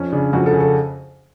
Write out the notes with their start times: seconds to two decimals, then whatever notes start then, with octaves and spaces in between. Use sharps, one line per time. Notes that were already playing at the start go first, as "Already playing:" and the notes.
Already playing: F2 C#4
0.12 C#3 D4
0.33 F2 F#4
0.46 A4
0.53 C#3
0.60 A4